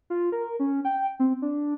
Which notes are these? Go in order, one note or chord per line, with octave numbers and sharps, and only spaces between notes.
F4
A#4
C#4
G5
C4
D4